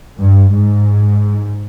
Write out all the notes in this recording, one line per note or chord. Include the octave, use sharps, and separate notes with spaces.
G2
G#2